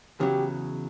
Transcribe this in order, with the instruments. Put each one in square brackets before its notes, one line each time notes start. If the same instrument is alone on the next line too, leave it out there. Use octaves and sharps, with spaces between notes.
[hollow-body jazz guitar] E2 C#3 F#3 [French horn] G4